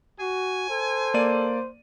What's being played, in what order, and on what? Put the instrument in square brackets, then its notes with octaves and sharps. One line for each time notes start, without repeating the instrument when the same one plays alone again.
[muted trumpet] F#4 [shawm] G#5
[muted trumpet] A4 [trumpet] C5
[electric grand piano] A#3 D5 D#7